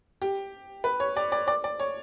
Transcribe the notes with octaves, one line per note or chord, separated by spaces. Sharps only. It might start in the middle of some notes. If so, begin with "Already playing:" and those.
G4
B4
C#5
D5
D5
D5
D5
C#5